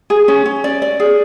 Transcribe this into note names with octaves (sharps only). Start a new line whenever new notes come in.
G#4
C#4
C#4
D5
D5
G#4